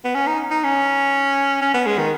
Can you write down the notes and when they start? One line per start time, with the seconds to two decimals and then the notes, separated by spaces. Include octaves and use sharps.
0.05 B3
0.15 C#4
0.27 D#4
0.51 D#4
0.64 C#4
1.62 C#4
1.74 B3
1.86 G#3
1.98 D#3